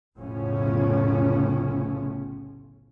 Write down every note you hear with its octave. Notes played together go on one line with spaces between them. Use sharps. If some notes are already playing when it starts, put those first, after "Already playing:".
F1 B1 A2 C#3 F3 C#4